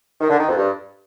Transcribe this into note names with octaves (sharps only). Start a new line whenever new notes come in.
D#3
D3
D#3
F2
G2